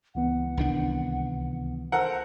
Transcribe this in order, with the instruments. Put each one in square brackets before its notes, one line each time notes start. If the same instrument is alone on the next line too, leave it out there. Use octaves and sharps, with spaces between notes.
[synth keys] C#2 E3 B3 [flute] F#5
[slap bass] C2 D#3 D4
[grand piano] A4 A#4 F#5 [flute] C5